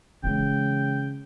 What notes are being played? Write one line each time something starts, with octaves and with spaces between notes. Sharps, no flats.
C#3 E3 G#3 G5